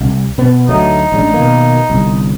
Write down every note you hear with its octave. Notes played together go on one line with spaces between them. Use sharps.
C2
B2 B3
D2 F#3 A3 D#4
A1 G#3 D4
B2 D#3 A#3
G1 C2